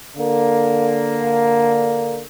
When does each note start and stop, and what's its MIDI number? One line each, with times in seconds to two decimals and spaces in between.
0.17 2.21 50
0.17 2.21 58